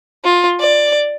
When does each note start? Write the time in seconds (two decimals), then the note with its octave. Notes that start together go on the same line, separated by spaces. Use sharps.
0.24 F4
0.60 D5